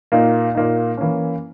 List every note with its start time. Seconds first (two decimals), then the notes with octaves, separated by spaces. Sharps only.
0.12 A#2 A#3 D#4
0.55 A#2 A#3 D#4
0.98 E3 A#3 C#4